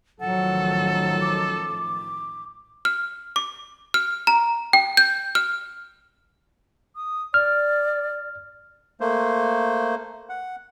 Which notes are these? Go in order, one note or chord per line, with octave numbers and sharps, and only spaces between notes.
A1 D#3 F3 F#3 A4 F#5
D6
F6
D6
F6
A#5
G5
G6
F6
D#6
D5 F6
A3 A#3 C5
F#5